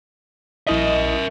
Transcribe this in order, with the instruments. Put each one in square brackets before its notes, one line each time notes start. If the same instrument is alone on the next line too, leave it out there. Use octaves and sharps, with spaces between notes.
[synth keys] A#1 E4 D#5 [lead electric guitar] A#4 E5